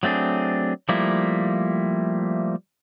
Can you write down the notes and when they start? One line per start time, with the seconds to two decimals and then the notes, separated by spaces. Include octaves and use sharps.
0.03 F#3 A3 C4 D4 G#4
0.89 F3 G3 A3 A#3 E4